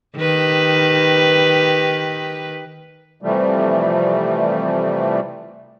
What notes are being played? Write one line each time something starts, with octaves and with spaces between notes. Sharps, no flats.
D#3 G4 B4
C3 E3 F3 G3 A3